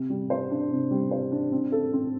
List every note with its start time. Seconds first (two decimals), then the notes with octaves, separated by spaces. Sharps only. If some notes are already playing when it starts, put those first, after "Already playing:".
Already playing: C3
0.10 G3
0.30 C5
0.50 D4
0.71 C3
0.91 G3
1.11 C5
1.32 D4
1.52 C4
1.72 A4
1.93 C4